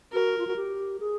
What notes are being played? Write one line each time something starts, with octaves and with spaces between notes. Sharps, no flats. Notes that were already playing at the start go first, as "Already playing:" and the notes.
F#4 A#4
F4
F#4
G4
G#4